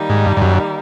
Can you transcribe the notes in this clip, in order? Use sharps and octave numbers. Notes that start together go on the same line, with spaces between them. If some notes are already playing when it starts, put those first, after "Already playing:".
Already playing: D#3 G3 A#3 D#4
G#2
G2
G2
F#2